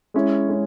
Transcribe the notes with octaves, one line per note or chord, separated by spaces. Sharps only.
G#3 C#4 E4
G#3 C#4